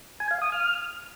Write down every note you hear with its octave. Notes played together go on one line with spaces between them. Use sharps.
G#5
F5
D#6
F6